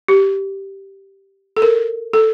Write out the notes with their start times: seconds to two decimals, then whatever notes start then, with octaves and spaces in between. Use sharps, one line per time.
0.08 G4
1.57 A4
1.62 A#4
2.13 A4